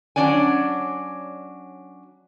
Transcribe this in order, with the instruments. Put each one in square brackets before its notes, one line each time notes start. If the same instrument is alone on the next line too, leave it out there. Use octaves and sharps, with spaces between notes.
[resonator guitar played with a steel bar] F#3 C#4 D4 D5 G#5